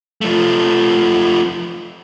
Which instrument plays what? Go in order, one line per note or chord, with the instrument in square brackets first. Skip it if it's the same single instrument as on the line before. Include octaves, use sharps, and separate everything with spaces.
[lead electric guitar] F3 A3